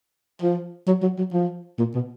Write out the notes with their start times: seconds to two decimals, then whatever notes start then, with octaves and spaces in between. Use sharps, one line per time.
0.42 F3
0.87 F#3
1.02 F#3
1.18 F#3
1.33 F3
1.79 A#2
1.95 B2